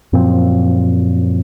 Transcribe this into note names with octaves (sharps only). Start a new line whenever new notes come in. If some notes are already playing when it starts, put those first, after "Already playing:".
F#2 A#2 F3 C4